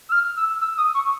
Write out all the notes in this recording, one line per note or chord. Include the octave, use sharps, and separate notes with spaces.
E6
F6
E6
E6
D#6
C#6